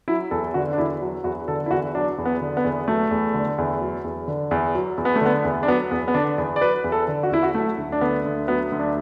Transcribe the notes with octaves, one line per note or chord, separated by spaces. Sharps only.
F#3 E4
E2 A4
D3 F#4
D4
E2 E4
F#3
E2 F#4
D3 A4
E4
E2 F#4
F#3 D4
E2
B3
D3
B3
E2
F#3 A3
E2
D3
E2
F#3
E2
D3
E2
F#3
E2
B3
A3
D3 B3
E2
D4
F#3 B3
E2 B3
B3
D3 D4
E2
D5
F#3 B4
E2
A4
D3
F#4
E2 E4
F#4
F#3 A3
D2
D4
D3 B3
D2
F#3 B3
D2
D4